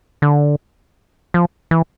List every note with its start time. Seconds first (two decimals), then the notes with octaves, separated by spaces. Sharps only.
0.22 D3
1.34 F3
1.71 E3